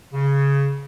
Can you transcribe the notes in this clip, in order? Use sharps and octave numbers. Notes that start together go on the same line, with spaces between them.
C#3